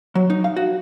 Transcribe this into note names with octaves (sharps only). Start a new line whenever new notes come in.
F#3
D#4
F5
F#4